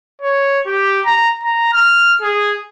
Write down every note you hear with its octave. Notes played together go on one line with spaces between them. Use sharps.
C#5
G4
A#5
A#5
F6
G#4